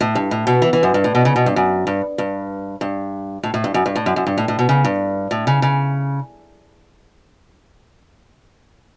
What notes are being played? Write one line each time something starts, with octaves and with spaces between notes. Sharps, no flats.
A2
G2
A2
B2
E3
E3
F#2
G2
A2
B2
C#3
B2
G2
F#2
G2
G2
G2
A2
A2
G2
F#2
G2
A2
F#2
F#2
G2
A2
A2
B2
C#3
G2
A2
C#3
C#3